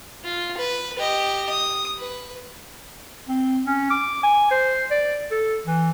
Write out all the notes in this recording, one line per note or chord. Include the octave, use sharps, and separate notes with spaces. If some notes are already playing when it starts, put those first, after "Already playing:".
F4
B4
G4 D#5
D#6
B4
C4
C#4
D6
G#5
C5
D5
A4
E3